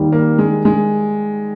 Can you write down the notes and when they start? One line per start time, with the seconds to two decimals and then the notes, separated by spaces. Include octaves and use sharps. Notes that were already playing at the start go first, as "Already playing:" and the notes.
Already playing: D#2 D#3 G3
0.12 A#3
0.39 G#3
0.65 G#3